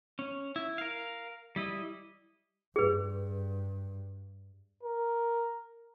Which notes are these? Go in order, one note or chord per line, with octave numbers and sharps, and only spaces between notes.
C#4
E4
A#4 F5
G3 E4 D#5
G2 G#4 B4
A#4